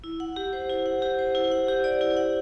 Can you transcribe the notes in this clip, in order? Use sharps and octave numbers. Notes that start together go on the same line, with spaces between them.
E4
F#5
G4
C5
E4
F#5
G4
C5
E4
F#5
G4
D5
E4
F#5